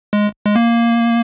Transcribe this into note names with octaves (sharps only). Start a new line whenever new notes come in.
G#3
G#3
A#3